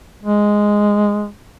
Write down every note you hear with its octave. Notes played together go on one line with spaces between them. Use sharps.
G#3